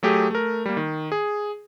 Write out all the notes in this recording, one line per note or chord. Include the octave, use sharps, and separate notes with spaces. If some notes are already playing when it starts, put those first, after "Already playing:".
F#3 A3 G4 G#4
A3 A#4
G3 A#3
D#3
G#4